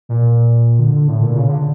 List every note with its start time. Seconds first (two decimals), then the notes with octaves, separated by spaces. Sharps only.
0.09 A#2
0.79 D3
1.08 A2
1.22 A#2
1.36 C#3
1.49 D3